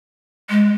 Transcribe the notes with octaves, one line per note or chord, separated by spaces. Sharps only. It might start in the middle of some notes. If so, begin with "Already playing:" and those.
G#3